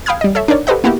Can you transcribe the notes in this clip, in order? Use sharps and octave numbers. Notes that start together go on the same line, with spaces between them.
F5 G5 B5 D#6 F6 G#6
G3 D#5
A4 C#5 E5
D4 D#4 A#4 C#5 D5
G4 A4 B4 C5 D#5 F#5
A#3 B3 E4 F#4 G4